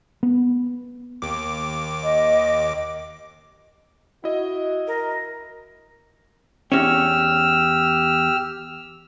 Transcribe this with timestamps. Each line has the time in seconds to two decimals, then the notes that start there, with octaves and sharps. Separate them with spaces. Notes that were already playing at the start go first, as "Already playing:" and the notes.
0.23 B3
1.22 D#2 D6
2.03 D#5
4.24 E4 F#4 D#5
4.87 A#4
6.72 E2 C#4 G4 E6 F6